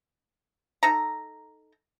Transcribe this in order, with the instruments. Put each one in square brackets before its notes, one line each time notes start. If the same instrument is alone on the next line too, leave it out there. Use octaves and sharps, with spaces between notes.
[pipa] D#4 A4 A#5